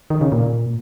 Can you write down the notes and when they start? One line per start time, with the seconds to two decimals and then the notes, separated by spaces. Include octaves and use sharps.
0.10 D#3
0.21 C#3
0.32 A#2